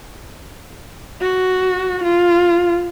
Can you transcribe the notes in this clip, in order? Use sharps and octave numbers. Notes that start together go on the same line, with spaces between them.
F#4
F4